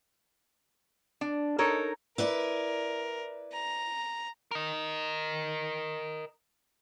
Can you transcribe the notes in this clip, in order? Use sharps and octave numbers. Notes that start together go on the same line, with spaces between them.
D4
D#4 A4 A#4 C#5
E4 A#4 B4 D5
A#5
A#4 D#5